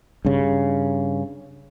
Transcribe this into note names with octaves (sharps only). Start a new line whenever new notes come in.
G2 C#3